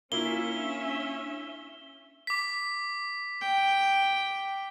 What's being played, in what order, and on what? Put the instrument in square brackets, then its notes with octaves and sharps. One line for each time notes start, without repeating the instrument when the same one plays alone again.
[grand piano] A#3 E4 F4 [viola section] C#4 E5 [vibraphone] D4 [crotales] G7
[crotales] D6 B6
[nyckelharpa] G5